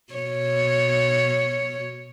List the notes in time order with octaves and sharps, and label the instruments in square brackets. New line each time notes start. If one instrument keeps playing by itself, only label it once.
[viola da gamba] B2 C#5